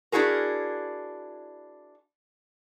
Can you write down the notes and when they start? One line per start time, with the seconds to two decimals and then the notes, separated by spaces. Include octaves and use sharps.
0.12 D4 E4 F#4 G#4 A#4